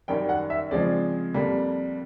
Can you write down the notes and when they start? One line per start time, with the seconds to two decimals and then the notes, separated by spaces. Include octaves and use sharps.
0.08 F#2 D#3 G3 G5
0.29 F#5
0.50 E5
0.71 C#3 F3 G#3 C4 D5
1.34 F2 D3 G3 A#3